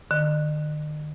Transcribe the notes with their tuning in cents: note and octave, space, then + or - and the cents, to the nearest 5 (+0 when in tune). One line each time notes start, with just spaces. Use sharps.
D#3 -45